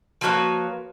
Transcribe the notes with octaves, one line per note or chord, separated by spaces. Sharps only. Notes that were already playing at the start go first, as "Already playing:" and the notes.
F3 F#3 A#3 F#4 B4 C#5